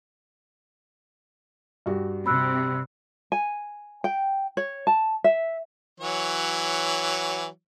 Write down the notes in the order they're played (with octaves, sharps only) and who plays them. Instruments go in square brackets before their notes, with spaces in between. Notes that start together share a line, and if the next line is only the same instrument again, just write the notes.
[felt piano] G2 F#4 G4
[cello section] C3 [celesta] B5 E6 F#6
[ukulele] G#5
G5
C#5
A5
E5
[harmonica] E3 F#3 C#5